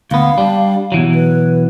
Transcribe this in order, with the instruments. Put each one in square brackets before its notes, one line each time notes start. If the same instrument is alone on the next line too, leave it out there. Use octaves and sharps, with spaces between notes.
[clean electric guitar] D2 B3 [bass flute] F5
[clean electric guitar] G3 D4
B2 E3 F#3
[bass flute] B4